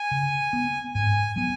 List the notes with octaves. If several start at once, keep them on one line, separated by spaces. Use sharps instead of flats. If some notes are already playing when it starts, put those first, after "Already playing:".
Already playing: G#5
C#3
B3
G#2 G#5
F#3 B3 G#5